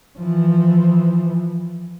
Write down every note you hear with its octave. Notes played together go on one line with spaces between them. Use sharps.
E3 F3